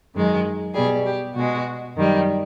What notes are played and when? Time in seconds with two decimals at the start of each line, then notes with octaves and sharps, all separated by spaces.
0.15 F#2 D#3 G#3
0.74 B2 G3 G#4
1.05 G4
1.35 B2 G#3 F#4
1.95 F#2 D#3 G3